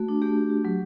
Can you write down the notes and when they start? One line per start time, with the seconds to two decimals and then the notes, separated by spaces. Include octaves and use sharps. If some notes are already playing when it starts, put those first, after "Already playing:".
Already playing: A3 F#4
0.09 D4
0.22 A3 G4
0.37 A3
0.50 F#4
0.65 F#3